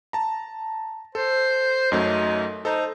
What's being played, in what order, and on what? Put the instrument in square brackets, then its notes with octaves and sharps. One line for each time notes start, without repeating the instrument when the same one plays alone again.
[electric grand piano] A5 A#5
[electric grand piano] A4 [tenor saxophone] C5
[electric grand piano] F#2 F#3 A3 [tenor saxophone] D#4
[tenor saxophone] D#4 [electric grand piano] A4 C5 A#5